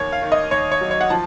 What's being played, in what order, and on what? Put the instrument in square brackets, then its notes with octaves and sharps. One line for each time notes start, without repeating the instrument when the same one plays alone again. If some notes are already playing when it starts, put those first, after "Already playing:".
Already playing: [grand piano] D#2 C#5
F5
D#3
D#5
D#2 C#5
C#5
F#3
C#5
F#5
F3 A5